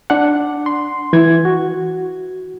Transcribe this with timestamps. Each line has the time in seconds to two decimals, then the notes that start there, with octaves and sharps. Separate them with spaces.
0.10 D4 F#5
0.66 C6
1.13 E3 G#6
1.45 F#4